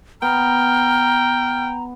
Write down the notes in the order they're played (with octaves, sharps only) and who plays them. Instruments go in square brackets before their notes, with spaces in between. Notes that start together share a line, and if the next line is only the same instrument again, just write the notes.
[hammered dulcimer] B3 [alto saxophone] G5 [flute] A#5 [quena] F6